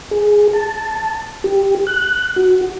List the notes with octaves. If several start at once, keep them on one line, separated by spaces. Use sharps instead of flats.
G#4
A5
G4
F#6
F#4